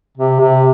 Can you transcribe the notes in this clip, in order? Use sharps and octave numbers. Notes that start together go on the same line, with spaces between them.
C3
C3